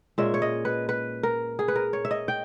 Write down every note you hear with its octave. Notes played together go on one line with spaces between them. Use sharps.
A#2 G#3 C#4 E5
C#5
D#5
B4
B4
A#4
G#4
B4
A#4
C#5
E5
D#5
G5